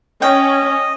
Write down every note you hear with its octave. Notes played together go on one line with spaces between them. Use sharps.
C#4 D#5 G5